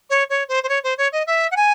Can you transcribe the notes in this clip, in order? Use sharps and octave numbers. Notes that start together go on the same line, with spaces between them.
C#5
C#5
C5
C5
C#5
C5
C#5
D#5
E5
F#5
G#5